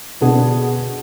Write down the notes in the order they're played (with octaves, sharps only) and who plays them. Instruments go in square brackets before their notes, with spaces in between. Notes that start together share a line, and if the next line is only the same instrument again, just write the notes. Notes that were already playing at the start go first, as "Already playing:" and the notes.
[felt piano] B2 D3 B3 D4 F#4 G#4